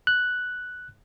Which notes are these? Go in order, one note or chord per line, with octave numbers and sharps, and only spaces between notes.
F#6